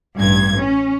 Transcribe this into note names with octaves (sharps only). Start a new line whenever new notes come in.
A1 G2 G#6
C#4